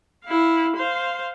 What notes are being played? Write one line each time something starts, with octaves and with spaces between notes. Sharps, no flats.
E4 F5
C5 F5